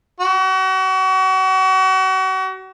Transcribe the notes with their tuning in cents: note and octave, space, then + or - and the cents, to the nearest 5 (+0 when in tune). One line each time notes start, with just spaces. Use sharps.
F#4 +35